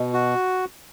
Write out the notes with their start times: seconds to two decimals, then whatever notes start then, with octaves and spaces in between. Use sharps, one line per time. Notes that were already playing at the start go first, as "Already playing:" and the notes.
Already playing: B2 B4 D#5
0.14 F#4